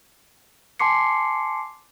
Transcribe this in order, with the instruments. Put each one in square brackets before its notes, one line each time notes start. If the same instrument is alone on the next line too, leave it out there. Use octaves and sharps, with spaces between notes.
[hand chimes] G#5 A5 C6 D6 C7 C#7